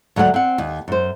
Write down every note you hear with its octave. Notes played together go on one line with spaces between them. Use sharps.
D2 F#3 A3 F5 F#5
C4 F#5
D#2
F#2 C5